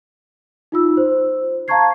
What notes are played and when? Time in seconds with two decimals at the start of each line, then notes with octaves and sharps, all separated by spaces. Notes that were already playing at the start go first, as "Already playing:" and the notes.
0.72 D#4 F4 E6
0.97 C5
1.68 F5 A5 A#5 C#6 G#6 C7